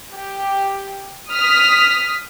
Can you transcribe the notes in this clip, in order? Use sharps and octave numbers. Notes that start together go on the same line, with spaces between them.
G4
D#6 F6 B6